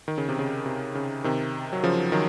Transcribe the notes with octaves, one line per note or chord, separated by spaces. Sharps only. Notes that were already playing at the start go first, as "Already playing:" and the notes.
D#3
C#3
C3
C#3
C3
C#3
C3 D#3
F#3
C#3 F3
D#3 F#3